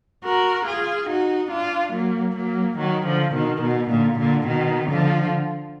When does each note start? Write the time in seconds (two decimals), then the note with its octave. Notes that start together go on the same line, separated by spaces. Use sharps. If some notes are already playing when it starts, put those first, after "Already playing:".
0.24 F#4 A#4
0.66 F4 G#4
1.08 D#4 F#4
1.51 D4 F4
1.93 F#3 A#3
2.35 F#3 A#3
2.78 D#3 F#3
3.06 D3 F3
3.34 B2 D#3
3.62 B2
3.90 A#2 D3
4.18 A#2 D3
4.46 B2 D#3
4.89 D3 F3